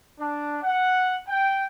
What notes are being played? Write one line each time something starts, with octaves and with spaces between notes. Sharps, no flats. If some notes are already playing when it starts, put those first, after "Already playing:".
D4
F#5
G5